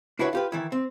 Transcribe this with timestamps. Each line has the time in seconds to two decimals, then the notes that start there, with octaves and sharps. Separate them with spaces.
0.19 D4 E4 F#4 B4 C#5
0.33 F4 G4 B4
0.52 D#3 E3 E4
0.72 C4